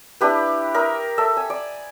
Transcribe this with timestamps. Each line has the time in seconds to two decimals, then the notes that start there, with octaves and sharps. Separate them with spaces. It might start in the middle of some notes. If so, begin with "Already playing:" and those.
0.21 D4 E4 G4 B4
0.74 A#4 E5 D#6
1.18 A4 E5
1.37 G#5
1.50 D5